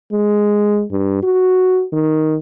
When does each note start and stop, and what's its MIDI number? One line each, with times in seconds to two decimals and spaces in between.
0.13 0.84 56
0.91 1.18 43
1.23 1.84 66
1.93 2.36 51